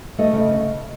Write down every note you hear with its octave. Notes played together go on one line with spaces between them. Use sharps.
A3 D#5
C#3